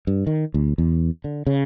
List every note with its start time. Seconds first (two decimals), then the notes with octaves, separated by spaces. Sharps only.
0.07 G2
0.27 D#3
0.54 D2
0.78 E2
1.24 D3
1.47 C#3